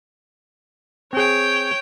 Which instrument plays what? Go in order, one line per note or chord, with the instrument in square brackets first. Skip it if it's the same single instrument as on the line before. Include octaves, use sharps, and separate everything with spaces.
[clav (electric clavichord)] C4 G#4 [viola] C#5 G5